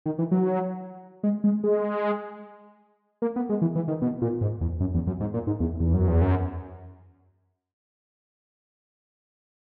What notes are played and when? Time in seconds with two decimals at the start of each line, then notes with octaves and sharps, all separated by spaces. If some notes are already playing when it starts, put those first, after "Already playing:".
0.06 D#3
0.19 E3
0.31 F#3
1.23 G#3
1.44 G#3
1.64 G#3
3.22 A#3
3.36 B3
3.49 G#3
3.62 E3
3.75 E3
3.88 D#3
4.02 B2
4.22 A#2
4.41 G#2
4.61 E2
4.80 F#2
4.95 E2
5.07 F#2
5.20 G#2
5.34 A#2
5.47 G#2
5.60 E2
5.80 E2
5.94 F#2
6.08 E2
6.21 F#2